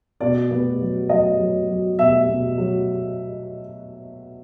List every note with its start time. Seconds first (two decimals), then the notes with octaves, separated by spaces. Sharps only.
0.21 B2 D5
0.51 B3
0.80 F#3
1.09 F#3 D#5
1.40 F#3
1.69 F#3
1.98 B2 E5
2.29 B2
2.58 F#3